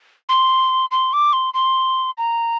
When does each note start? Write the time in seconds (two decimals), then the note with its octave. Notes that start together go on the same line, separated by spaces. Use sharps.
0.29 C6
0.91 C6
1.13 D6
1.33 C6
1.54 C6
2.18 A#5